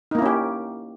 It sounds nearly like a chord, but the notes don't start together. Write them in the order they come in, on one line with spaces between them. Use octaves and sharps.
D#4 A#3 E4 C#4 G4